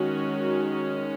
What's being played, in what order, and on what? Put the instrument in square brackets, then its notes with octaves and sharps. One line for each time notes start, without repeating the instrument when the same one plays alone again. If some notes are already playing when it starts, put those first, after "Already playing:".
Already playing: [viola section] D#3 G#3 C#4 F#4